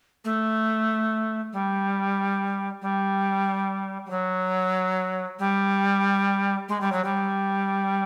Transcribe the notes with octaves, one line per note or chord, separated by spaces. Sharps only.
A3
G3
G3
G3
F#3
G3
G#3
G3
F#3
G3